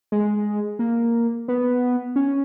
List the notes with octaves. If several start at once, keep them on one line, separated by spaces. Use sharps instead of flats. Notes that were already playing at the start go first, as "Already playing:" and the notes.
G#3
A#3
B3
C#4